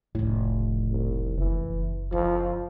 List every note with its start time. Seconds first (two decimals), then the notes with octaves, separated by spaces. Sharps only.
0.15 F1 C#2 A2
0.91 C2
1.38 F#1 E3
2.12 F3 E4